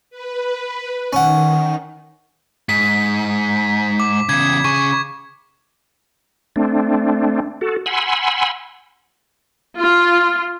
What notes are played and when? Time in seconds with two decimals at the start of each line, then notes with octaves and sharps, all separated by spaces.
0.10 B4
1.13 D#3 C#4 F#5
2.69 G#2 B6
4.00 D6
4.29 E2 C#3 G#6
4.65 C#3 G#4 C#6
6.56 A3 C4 D4
7.61 F#4 A4
7.86 F#5 G#5 B5 C6 E6
9.77 F4